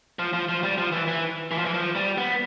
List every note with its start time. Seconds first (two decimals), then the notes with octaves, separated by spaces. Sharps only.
0.19 F3
0.33 F3
0.49 F3
0.63 G3
0.78 F3
0.92 E3
1.07 E3
1.51 E3
1.58 F3
1.65 E3
1.74 F3
1.95 G3
2.18 B3